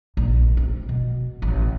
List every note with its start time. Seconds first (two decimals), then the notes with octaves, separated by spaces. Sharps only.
0.17 A#1
0.57 C4
0.89 B2
1.42 A1